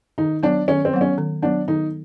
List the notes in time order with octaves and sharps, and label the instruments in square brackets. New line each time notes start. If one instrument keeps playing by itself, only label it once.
[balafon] D#3 [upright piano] D#4
[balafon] F#3 B3 [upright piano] D4
[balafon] D#3 [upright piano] C#4
[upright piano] C4
[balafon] F#3 B3
[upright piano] C#4
[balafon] D#3
[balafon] F#3 B3 [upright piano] D4
[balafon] D#3 [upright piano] D#4